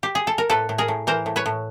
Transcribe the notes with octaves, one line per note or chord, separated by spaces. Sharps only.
G4
G#4
A4
A#4
A2 A4 B4
A2
G#4 A#4
A2
E3 A#4 C5
A2
B4 C#5
A2